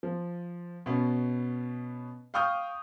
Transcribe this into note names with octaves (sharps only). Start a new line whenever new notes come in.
F3
B2 B3 C#4
F5 G5 C#6 D#6 F6 G6